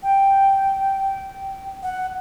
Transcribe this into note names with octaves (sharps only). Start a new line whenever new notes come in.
G5
F#5